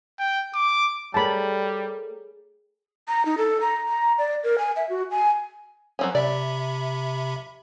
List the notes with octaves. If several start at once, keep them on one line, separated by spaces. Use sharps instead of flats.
G5
D6
G3 A3 G4 G#4 A#4 C#5 A5 B5
A#5
D#4
A4
A#5
A#5
D5
A#4
G#5
E5
F#4
G#5
F#3 C4 C#4
C3 D5 E5 B5